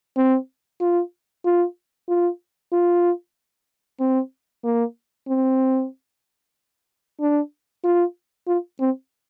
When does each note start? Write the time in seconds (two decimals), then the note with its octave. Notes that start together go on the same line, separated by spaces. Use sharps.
0.17 C4
0.81 F4
1.45 F4
2.09 F4
2.72 F4
4.00 C4
4.64 A#3
5.28 C4
7.20 D4
7.84 F4
8.47 F4
8.80 C4